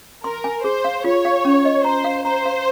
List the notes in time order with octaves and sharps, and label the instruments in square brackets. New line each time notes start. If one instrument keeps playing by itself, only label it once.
[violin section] A#4 [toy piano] C6
[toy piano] G#5
[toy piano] G#4 [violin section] C5
[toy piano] F5
[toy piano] F4 [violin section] C#5
[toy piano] F5
C#4
D#5
[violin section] C5 [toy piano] A#5
[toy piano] F5
[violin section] C5 [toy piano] A#5
[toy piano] F5